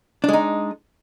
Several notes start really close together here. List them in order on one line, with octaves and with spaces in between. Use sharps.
D4 G#3 D#4